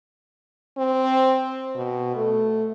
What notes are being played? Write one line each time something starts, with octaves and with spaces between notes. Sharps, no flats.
C4
B2
A3